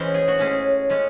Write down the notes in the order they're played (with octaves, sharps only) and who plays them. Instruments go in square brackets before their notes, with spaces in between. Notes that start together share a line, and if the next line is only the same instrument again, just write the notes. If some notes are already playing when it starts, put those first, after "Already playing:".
Already playing: [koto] E3 G#3 C#4 E4 F#4 C5
G#4
F#4
A2 G#3 C#4 G#4
A2 G#3 C#4